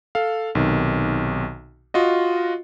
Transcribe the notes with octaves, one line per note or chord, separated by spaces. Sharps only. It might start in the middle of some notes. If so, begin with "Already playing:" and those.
A4 F5
B1 C3 D#3
F4 F#4 D#5